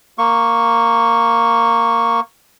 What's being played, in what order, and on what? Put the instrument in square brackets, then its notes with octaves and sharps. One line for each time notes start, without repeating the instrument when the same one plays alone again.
[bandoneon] A#3 C#6